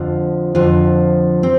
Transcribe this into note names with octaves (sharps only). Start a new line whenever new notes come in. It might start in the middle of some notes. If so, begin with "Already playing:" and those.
Already playing: F2 D3 F3
F2 D3 F3
C4